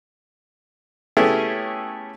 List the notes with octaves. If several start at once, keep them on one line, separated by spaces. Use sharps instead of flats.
A3 B3 C#4 E4 G4 G#4